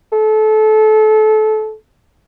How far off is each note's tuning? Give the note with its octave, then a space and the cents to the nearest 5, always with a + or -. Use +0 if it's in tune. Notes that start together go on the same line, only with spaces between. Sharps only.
A4 -25